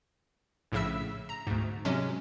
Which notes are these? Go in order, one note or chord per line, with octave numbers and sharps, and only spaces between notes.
A#1 A2 C#3 E5 E6
A#5
D2 G#2
C3 F#3 G#3 C#4